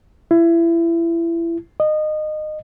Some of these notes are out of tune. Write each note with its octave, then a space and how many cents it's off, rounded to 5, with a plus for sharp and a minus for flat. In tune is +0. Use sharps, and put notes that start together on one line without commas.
E4 +25
D#5 -25